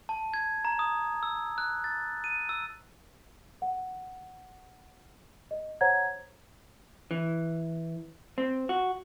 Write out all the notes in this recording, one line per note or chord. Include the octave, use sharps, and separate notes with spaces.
A5
G#6
A#5
D#6
E6
F#6
A6
D#7
E6
F#5
D#5
C5 C#5 F#5 A#5 G#6
E3
C4
F#4